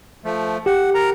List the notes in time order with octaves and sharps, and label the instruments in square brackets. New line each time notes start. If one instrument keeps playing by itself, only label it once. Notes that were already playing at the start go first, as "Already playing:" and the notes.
[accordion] F3 A3
[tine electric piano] G4 [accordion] F#5
[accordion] A#4 A#5